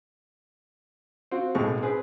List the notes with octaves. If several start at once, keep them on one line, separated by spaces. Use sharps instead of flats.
C4 F4 F#4
B1 A2 G#3 C#6
C4 G#4 B4